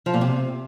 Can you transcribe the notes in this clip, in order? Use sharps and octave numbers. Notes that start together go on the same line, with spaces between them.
F3
A#2
C3